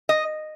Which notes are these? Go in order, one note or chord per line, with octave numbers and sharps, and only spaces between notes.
D#5